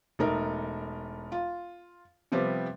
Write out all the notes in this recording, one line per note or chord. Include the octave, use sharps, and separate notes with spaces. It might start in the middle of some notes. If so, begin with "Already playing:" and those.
E1 A3 D#4 A#4
F4
C3 F3 G3 B3